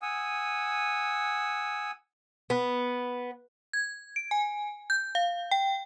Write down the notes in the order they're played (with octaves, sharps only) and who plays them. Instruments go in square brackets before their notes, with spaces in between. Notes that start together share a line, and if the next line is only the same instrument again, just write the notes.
[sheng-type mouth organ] F#5 G#5 D#6 E6
[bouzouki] B3
[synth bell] G#6
D7
G#5
G6
F5
G5